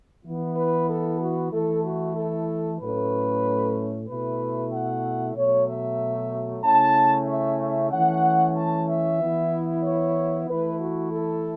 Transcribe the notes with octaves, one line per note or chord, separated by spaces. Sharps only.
E3 B3 E4
B4
A4
F#4
E3 A3 E4 A4
F#4
A4
A2 F#3 A3 C#4 B4
B2 A3 E4 B4
F#5
B2 F#3 A3 C#5
E5
C#3 A3 C#4 E4 A5
E5
E5
E3 A3 C#4 F#5
A5
E5
E3 B3 E4
C#5
E3 A3 E4 B4
F#4
A4